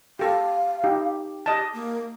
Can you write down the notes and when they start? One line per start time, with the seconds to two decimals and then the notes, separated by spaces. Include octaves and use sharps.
0.19 G4 A4 F5
0.84 D#4 G4
1.46 G4 D#5 A5
1.73 A#3